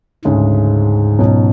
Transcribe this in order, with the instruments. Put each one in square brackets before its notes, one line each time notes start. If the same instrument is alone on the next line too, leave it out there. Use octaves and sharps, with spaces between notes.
[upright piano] D2 C#3 G#3 C#4 [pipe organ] G#2
[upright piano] C#2 B2 F#3